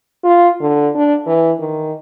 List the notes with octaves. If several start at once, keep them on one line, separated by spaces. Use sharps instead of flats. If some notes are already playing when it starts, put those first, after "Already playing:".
F4
D3
D4
E3
D#3